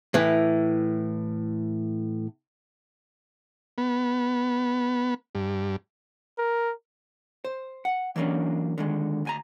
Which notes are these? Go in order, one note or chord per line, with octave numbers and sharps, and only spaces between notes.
A2 E3
B3
G2
A#4
C5
F#5
E3 F#3 A#3 C#4 D4
D3 D#3 G#3
D2 G#5 A#5